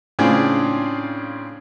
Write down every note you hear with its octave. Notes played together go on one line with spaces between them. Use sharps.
A2 C#3 C4 D4 F4 G#4